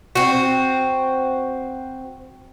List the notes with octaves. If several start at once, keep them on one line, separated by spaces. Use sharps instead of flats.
C4 F#4